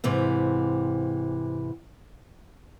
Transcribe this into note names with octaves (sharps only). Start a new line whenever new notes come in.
G#2 C3 E3 C4